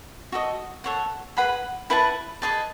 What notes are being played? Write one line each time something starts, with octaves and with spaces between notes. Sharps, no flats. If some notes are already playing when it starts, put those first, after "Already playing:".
F#4 A4 D#5
A4 C#5 F#5
G#4 B4 F#5 B5
E4 B4 F#5 A5
G#4 B4 D#5 A5